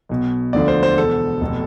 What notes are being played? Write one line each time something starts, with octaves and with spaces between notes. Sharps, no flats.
B1 B2
E1 D2 D3 F3 D5
C5
C5
E2 B2 A4
F1 B2